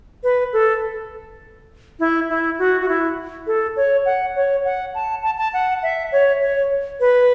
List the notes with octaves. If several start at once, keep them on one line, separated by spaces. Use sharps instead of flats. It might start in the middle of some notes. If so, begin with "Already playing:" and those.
B4
A4
E4
E4
F#4
F#4
E4
A4
C#5
F#5
C#5
F#5
A5
A5
A5
F#5
E5
C#5
C#5
B4